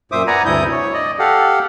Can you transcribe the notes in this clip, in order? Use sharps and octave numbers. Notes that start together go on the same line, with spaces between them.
F#2 A#2 C5 E5 D6 D#6
B4 D5 F#5 G#5 A#5
D2 G2 C3 E4 D#6 G6
C#5
D5 D#5
G4 A4 F5 F#5